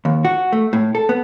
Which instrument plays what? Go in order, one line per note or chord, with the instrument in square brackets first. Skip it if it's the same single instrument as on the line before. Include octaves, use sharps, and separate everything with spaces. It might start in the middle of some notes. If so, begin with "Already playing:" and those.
[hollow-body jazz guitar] D#2
F#4
A3
A2
A4
B3